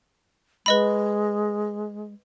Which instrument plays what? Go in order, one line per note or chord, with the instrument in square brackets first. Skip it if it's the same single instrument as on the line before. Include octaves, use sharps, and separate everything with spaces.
[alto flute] G#3 [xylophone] B4 D#5 B5